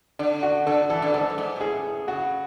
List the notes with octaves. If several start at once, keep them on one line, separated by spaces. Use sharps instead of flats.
D3 D4
F#4
D3 A4
E3 A4
D3
G#2 A4
F#2
G#2
B2
A2 G#4
C#3 F#4